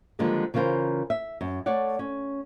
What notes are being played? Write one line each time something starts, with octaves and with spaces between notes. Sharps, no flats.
D3 D#3 F3 G3 G#3 A#3
C#3 E3 F4 A#4 C5
E5
F#2
A3 C#5 D5 F#5
C#4